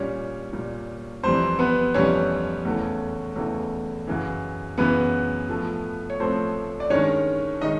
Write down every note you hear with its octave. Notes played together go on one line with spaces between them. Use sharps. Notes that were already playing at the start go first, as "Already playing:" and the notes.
Already playing: A#2 G3 C#4 C#5
A#2 G3
F2 C3 E3 G3 C4 C5
B3 B4
F2 C3 E3 G3 C#4 C#5
E2 C#3 E3 A3
E2 C#3 E3 A3
F#2 C#3 E3
F#2 C#3 E3 B3 B4
A2 F3 A3
C#5
A2 F3 A3 C4 C5
D5
G2 D#3 G#3 C#4 C#5
D#3 G#3 D#4 D#5